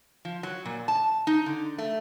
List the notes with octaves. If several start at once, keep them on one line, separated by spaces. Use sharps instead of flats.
F3
F#3
A#2
A5
D#4
D3
A3